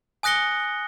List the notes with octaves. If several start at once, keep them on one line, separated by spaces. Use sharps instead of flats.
G#5 D#6 F#6 A#6 C#7 G7